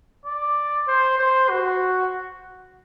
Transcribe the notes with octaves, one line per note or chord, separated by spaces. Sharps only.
D5
C5
C5
F#4